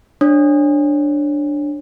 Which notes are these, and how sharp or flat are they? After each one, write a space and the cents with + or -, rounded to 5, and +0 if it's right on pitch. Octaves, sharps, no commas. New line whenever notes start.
D4 +0 C#5 -25